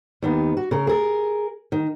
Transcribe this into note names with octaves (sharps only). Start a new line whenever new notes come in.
D#2 D#3 B3
F#4
C#3 A#4
G#4 A#4
D#3